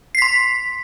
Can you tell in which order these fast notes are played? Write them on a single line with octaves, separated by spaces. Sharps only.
C7 B6 C6